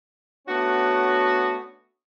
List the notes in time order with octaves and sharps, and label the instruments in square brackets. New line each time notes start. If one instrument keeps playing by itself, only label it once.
[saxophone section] A3 B3 C#4 D4 F#4